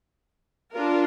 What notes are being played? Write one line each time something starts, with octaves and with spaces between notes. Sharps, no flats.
D4 F4 A#4